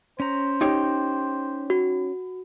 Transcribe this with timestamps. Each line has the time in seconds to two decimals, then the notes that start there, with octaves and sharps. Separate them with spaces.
0.20 C#4 C5 A#5
0.61 D#4 G4 C#5
1.70 F#4